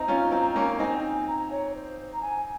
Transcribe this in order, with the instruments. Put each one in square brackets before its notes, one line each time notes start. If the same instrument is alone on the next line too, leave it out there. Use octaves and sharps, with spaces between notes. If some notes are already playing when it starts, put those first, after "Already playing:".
Already playing: [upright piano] C4 D#4 [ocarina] A#5
[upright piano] C#4 F4
C4 D#4
A#3 C#4
[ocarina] A#5
[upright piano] C4 D#4 [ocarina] G#5
[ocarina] G#5
A#5
C#5
C5
A#5
G#5